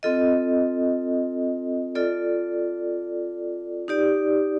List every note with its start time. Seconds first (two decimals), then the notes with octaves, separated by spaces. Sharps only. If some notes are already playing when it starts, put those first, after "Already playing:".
0.03 C4 F4 A4 D#5
1.95 F4 A4 D5
3.88 D#4 G4 D5